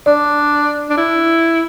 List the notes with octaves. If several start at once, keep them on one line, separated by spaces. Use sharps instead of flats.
D4 D5
D4
E4